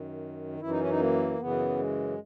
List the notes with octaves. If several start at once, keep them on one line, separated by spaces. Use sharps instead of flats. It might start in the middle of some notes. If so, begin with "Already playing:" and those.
Already playing: F#2 D#3
F#2 E3 E4
D#4
C#4
D#4
A#3
F#2 C#3 E3 B3
G#3